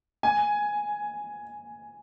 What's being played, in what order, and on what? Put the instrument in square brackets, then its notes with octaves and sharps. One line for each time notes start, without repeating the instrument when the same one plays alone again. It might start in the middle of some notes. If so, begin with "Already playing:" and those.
[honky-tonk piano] G#5